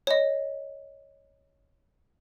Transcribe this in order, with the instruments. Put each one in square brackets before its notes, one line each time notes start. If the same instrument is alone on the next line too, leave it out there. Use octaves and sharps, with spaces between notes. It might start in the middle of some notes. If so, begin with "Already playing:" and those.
[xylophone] C#5 D#5